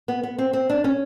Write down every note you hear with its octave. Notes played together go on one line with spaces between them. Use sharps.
B3
B3
C4
C4
D4
C#4